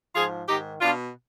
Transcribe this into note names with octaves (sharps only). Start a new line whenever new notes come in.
G#2 F3 F4 G#4
G#2 D#3 D#4 G4
B2 D4 F4